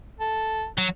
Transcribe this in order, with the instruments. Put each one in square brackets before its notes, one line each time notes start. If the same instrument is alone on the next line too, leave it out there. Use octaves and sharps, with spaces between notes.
[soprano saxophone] A4
[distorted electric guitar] F#3